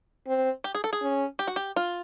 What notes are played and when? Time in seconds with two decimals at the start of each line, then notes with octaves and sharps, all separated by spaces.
0.27 C4
0.64 G4
0.75 G#4
0.84 A4
0.93 G#4
1.02 C#4
1.39 G4
1.47 F#4
1.56 G4
1.76 F4